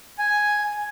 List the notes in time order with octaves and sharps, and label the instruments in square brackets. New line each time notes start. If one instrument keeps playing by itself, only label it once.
[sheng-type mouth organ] G#5